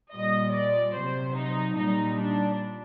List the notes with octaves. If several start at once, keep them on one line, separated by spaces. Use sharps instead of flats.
A#2 G3 D#5
D5
C3 F#3 C5
D#4
A#2 G3 D#4
D4